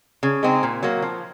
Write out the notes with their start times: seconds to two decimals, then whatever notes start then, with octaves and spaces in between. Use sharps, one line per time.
0.23 C#3
0.43 G#3 C4 D#4
0.63 A#2
0.83 F#3 A#3
1.02 F3